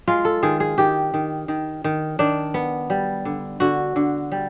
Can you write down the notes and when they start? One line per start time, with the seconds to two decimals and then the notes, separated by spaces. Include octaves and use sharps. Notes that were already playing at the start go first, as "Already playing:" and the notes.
0.08 G#3 F4
0.25 A4
0.43 D#3 G#4
0.60 G#4
0.78 D#3 G4
1.14 D#3
1.48 D#3
1.84 D#3
2.19 D#3 D4
2.54 B3
2.90 G3
3.25 D3
3.60 D3 F#4
3.96 D3
4.32 G3